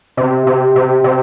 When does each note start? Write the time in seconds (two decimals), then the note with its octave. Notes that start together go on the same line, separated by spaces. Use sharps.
0.17 C3
0.47 C3
0.76 C3
1.04 C3